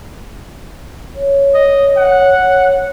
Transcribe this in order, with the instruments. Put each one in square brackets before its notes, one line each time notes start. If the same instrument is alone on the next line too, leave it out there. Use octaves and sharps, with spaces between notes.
[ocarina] C#5
[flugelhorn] D#5
F#5